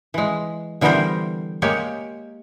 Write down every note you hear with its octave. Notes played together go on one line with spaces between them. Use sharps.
E3 G#3
D3 E3 G3 B3 A#4 C5
G#3 A#3 G4 C#5